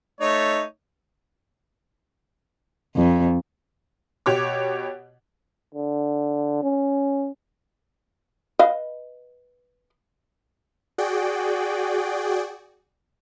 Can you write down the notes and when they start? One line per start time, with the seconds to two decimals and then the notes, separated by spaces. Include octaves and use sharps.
0.21 A3 D#4 C#5
2.96 F2
4.26 B2 G4 C#5 D6
5.75 D3
6.63 C#4
8.59 B4 D#5 F5
10.98 F#4 G#4 D5 G5